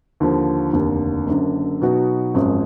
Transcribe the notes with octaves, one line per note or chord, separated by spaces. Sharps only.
D#2 D3 F3
F1 D#2 D3
F#1 F#2 D3
B2 F#3 B3 D#4 F#4
G#1 F#2 F3 G#3